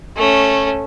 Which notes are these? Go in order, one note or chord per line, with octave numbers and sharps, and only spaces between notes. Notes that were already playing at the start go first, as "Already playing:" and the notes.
A3 C#4